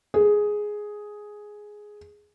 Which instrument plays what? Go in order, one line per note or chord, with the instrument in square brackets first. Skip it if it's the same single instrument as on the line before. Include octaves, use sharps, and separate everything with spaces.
[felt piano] G#4